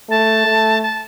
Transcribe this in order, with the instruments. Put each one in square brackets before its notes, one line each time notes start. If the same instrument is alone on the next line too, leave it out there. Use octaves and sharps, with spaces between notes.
[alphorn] A3 [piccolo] A5
[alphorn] A3
[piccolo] A5